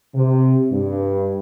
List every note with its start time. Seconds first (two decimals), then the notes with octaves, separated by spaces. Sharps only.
0.15 C3
0.71 G2